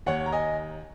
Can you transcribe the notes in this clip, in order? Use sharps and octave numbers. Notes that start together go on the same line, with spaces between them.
D#2 C#5 F#5
A#5
D#5 G#5